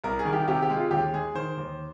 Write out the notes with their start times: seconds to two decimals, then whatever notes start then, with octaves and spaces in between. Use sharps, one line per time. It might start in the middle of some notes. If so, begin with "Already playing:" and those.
0.04 C2 A#4
0.19 G#4
0.25 D#3
0.33 G4
0.48 C3 G4
0.62 G4
0.70 G#3
0.77 F4
0.91 D#2 G4
1.13 G#3 G#4
1.35 D#3 C5
1.57 D#2